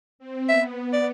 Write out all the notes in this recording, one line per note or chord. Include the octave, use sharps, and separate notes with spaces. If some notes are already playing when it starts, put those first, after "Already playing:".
C4
B3 E5
D5